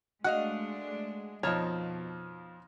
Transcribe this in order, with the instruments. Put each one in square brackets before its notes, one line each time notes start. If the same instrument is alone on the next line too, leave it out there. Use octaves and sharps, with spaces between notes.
[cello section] G#3 A3 D4 [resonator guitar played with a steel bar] F#4 D#5 F5 [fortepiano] F#5
[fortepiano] F2 D#4 [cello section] B2 [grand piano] F3 F6 [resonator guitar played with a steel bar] C#5 A5